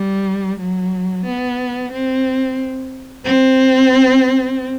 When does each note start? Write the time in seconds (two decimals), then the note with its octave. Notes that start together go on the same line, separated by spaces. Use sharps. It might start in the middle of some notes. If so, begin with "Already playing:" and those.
Already playing: G3
0.59 F#3
1.25 B3
1.92 C4
3.24 C4